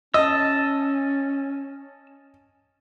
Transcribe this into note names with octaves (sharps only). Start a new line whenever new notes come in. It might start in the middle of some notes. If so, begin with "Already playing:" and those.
C#4 D#5 A5 E6